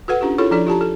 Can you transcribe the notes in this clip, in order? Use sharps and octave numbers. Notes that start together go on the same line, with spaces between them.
F#4 A4 B4 F#5
C#4 D4 F4 G4
E4 F4 G#4 A4 C#5
F3 D4 E4 A4 D5
F4 G4 A5 A#5
A4